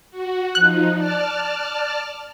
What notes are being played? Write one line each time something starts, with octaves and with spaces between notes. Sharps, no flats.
F#4
F3 D#4 F#6
D5 A5 F6